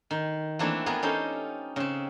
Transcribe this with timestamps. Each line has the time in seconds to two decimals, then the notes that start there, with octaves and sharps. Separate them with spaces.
0.11 D#3
0.59 E3 A3 A#3 C4 D4 E4
0.86 B3 F4 G#4 A#4
1.03 C#4 D#4 G4 A4 C5
1.76 C#3 C4